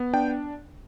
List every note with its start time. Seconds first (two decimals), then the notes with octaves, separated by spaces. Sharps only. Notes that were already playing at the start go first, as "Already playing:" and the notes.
Already playing: B3
0.13 D4 G5